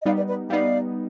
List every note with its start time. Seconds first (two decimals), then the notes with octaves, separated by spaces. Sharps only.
0.01 D#5
0.05 G3 B3 D#4 D5 F5
0.16 B4 D5
0.27 B4 D5
0.50 G3 B3 D#4 D5 F5